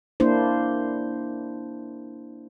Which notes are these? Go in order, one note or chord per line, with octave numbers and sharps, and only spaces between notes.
A#3 D4 E4 C5